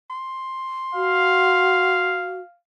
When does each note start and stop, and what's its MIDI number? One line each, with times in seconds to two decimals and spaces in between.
0.10 2.30 84
0.95 2.41 66
0.95 2.58 77